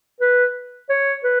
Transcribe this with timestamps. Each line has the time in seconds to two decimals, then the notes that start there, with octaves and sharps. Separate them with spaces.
0.21 B4
0.90 C#5
1.24 B4